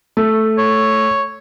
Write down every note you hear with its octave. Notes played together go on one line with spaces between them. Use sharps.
A3
C#5